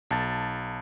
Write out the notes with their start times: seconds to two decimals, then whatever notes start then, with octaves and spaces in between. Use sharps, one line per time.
0.11 B1 A5 A6